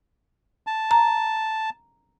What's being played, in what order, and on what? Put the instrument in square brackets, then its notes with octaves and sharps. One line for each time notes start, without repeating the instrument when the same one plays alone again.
[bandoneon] A5
[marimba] A#5